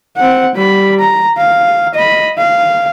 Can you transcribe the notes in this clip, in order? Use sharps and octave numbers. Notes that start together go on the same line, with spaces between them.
C4 F#5
G3 B5
A#5
F5
D#5 B5
F5